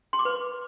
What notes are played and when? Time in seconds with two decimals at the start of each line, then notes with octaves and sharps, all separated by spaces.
0.13 C6
0.19 D6
0.25 B4